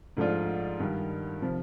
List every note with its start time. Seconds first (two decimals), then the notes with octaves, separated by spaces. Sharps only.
0.17 G#2 F3 A3 D4 F4
0.79 G2 D#3 G3
1.42 C3 F3